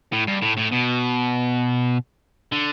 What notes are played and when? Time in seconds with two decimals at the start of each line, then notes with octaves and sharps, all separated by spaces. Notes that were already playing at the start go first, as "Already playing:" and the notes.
0.13 A2
0.28 G2
0.42 A2
0.58 A2
0.72 B2
2.52 D3